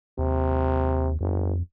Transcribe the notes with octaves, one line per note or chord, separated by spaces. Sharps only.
D#2 C3
G1 F2